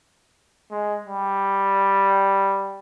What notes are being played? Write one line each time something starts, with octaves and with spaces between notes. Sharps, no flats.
G#3
G3